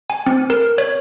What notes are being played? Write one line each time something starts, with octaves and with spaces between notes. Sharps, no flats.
G#5
C4
A#4
C#5